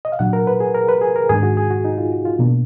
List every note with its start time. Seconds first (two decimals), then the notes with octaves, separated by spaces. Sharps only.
0.05 D#5
0.12 F5
0.19 A#2 F#3 D4 F#5
0.33 A#4
0.47 B4
0.60 G#4
0.74 A#4
0.89 B4
1.01 G#4
1.16 A#4
1.29 G#2 D#3 G#3 D4 G#4
1.43 F#4
1.57 G#4
1.70 F#4
1.85 D#4
1.98 F4
2.12 F#4
2.25 F4
2.39 B2 A#3 D4